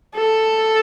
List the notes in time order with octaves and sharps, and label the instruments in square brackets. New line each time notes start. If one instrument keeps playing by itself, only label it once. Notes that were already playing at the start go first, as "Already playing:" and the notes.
[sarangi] A4